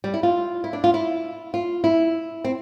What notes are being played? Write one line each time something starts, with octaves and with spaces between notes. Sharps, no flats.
G3
E4
F4
E4
D4
F4
E4
F4
E4
C4